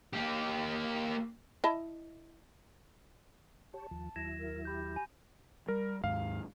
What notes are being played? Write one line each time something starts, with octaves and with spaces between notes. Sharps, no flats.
A#3 G4
E4 D#5 A5
G4 C#5 A5
D#2 F3
D#2 F#3 E4 G#6 A#6 E7
A#4
G4 B5 G6
G#5 B5
G3 A#4
D#2 G#2 F5